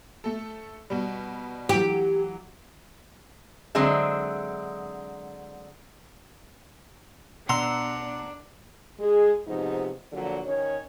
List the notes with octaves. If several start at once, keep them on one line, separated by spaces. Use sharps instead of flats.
A3 A4
B2 G3
E3 F#3 G4
D3 F#3 G#3 C4 E5
B2 D4 F#5 A#5 C6 E6
G#3 G#4
G#2 C3 F3 B3 D#4
A#2 D3 F3 F#3
D#3 C#4 C#5